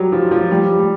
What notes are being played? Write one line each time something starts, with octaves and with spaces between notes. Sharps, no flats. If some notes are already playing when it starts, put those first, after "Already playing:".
Already playing: F#3 G3
F3
F3
G3
G3